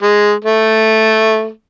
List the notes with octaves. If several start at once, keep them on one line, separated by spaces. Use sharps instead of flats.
G#3
A3